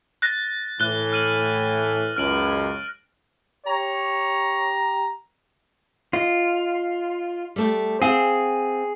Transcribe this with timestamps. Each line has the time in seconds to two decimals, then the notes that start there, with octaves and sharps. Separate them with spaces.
0.22 F#6 A6 A#6
0.80 A2 E3 F#6 G7
1.13 F6 D#7 F#7
2.16 C#2 F#2 F6 D7 F#7
3.66 G4 C#5 A#5
6.13 F4 D#5
7.56 G3 A3 G4
8.02 C4 G#4 F5 F#5